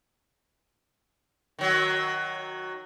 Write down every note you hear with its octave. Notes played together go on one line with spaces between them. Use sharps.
D#3 F#3